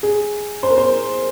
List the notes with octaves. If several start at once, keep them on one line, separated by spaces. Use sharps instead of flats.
G#4
C5
A#4
C5